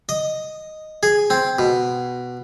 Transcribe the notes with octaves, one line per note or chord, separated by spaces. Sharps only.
D#5
G#4
C4
B2